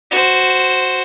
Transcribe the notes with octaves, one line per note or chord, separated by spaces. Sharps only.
F#4 C5